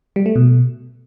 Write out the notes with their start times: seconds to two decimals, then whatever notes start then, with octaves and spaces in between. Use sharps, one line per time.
0.16 G3
0.26 A3
0.36 B2